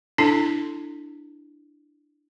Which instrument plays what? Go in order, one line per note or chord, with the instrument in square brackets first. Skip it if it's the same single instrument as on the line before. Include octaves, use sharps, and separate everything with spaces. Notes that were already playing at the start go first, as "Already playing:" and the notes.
[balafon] D4 E4 A4 A5